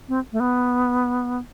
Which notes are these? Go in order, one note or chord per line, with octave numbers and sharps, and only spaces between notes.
C4
A3
B3